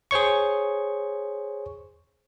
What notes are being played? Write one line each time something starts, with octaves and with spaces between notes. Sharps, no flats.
G#4 C5 C#5 C#6